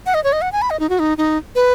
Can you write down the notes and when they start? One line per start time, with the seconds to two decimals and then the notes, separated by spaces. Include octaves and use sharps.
0.06 F#5
0.14 D#5
0.24 C#5
0.33 D#5
0.42 F#5
0.52 G#5
0.62 B5
0.70 D#5
0.80 D#4
0.89 F#4
0.99 D#4
1.18 D#4
1.55 B4